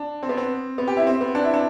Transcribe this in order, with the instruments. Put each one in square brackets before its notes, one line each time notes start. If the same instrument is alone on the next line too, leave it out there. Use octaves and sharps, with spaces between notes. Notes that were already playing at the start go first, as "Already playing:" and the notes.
Already playing: [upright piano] D4
C4
B3
C4
B3
G4
E4
C4
B3
D4
E4
D4